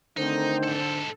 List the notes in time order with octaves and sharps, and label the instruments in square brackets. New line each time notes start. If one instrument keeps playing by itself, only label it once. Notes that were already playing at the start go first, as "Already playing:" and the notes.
[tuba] D3 [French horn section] D#3 A3 C4 [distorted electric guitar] D#4 [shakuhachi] C5
[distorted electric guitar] G#2 A4